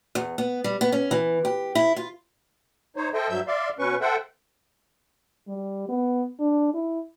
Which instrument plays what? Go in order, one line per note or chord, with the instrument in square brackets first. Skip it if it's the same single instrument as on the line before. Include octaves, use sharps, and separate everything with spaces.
[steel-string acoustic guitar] E2
B3
G3
B3
C#4
E3
G4
E4
F4
[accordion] D#4 C5 C#5
A4 C5 D#5 E5 G5
G2 F#3 E5 E6 G6
D5 E5 F5 C6
B2 C#4 B4 C#6
A4 C5 E5 F#5 G5
[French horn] G3
B3
D4
E4